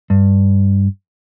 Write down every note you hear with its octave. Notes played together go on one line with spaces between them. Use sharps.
G2